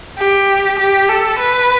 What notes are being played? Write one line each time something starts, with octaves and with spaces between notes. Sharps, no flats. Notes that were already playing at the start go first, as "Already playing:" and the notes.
G4
G4
A4
B4